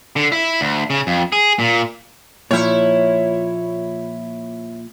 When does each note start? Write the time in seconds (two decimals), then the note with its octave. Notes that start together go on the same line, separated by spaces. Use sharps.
0.16 D3
0.32 E4
0.61 D2
0.90 C#3
1.07 F2
1.32 G#4
1.59 A#2
2.51 A#2 F3 E4 C#5